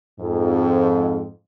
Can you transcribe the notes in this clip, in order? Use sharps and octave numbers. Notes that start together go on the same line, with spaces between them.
F2 G#2